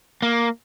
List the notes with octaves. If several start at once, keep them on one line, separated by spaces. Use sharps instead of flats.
A#3